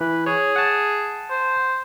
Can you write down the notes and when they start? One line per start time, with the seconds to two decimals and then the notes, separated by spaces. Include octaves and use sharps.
0.01 E3 B4
0.26 G#4 C#5
0.56 F#5 A5
1.30 C5